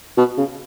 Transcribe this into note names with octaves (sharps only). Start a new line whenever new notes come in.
B2
C#3